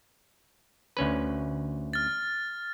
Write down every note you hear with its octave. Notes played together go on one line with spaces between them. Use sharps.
D2 C#4 B4
F6 A6